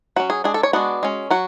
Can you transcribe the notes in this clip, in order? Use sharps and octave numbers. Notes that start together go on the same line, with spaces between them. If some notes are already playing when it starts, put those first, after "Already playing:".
F#3 C#4 F#4
G#4
G#3 D4 G#4
A4
C#5
G#3 B3 D4 F#4
G#3 C#4
F#3 F#4